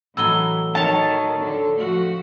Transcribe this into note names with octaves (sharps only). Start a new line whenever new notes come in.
A2 E3 F#3 D#4 E6 G7
D#3 C#5 A5
D3 A4
F3 A3 F#4